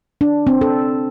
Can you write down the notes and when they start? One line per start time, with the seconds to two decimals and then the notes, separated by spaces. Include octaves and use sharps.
0.21 D4
0.47 C4
0.61 A4